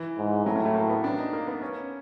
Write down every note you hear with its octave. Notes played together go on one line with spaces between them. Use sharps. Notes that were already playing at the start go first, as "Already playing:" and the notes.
Already playing: E3
G#2
A2 F#3
E3
A3
A#3
B3
D4
D#4
A#3
B3
C#4